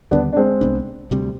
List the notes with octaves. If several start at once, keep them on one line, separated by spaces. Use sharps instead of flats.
D#2 D3 G3 B3 D4
D4
G#3 C4
C2 B2 B3 D4
D2 C3 G3 C4